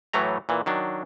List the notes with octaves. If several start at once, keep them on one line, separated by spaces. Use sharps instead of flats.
A2 E3 F#3 A3 A#5
A#2 E3
D#3 F#3 D4